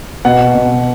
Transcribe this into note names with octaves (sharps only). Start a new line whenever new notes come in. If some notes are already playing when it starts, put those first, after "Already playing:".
B2 F#5
B2